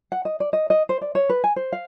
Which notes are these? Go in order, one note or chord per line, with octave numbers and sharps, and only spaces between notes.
F#5
D#5
D5
D#5
D#5
C5
D5
C#5
B4
G#5
C5
F5